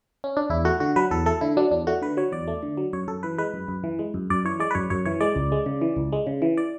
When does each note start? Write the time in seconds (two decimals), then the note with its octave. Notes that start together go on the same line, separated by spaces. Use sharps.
0.24 C#4
0.37 D4
0.50 E2 E4
0.65 A3 F#4
0.80 D3 F#4
0.96 F#3 B4
1.11 E2 A4
1.26 A3 A4
1.41 D3 E4
1.57 F#3 D4
1.71 E2 D4
1.87 A3 F#4
2.02 D3 B4
2.17 F#3 C#5
2.32 E2 D5
2.47 A3
2.63 D3
2.77 F#3
2.93 F#2 C#5
3.08 F#2 A4
3.23 E3 B4
3.38 G#3 B4
3.54 F#2
3.68 F#2
3.84 E3
3.99 G#3
4.14 F#2
4.30 F#2 D5
4.45 E3 C#5
4.60 G#3 D5
4.71 B4
4.75 F#2 C#5
4.90 F#2 C#5
5.06 E3 C#5
5.21 G#3 D5
5.36 C#2
5.52 G#3
5.66 C#3
5.81 E3
5.96 C#2
6.12 G#3
6.27 C#3
6.42 E3
6.58 D5